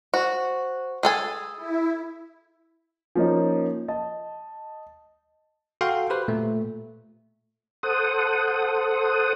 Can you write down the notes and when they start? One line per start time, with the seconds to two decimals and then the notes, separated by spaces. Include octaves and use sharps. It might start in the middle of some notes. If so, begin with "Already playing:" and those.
0.14 F#4 C5
1.03 G#4 A4 G#5 B5 D#6 G6
1.57 E4
3.15 F3 A#3 C#4 D#4
3.88 D#5 A5
5.81 F#4 A4 F5 G5 C6
6.10 G4 B4 C5
6.28 A#2 A3
7.83 A4 C5 F#5 D#6